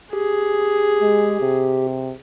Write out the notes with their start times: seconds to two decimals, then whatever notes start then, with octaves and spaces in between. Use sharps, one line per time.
0.13 G4 G#4
1.01 G#3
1.41 C3